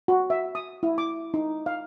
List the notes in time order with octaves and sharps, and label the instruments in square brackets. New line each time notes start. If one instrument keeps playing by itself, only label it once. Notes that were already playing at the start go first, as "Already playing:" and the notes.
[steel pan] F#4
E5
D#6
E4
D6
D#4
F5